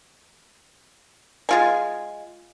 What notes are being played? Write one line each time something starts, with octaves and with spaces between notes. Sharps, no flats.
G#3 F4 G#5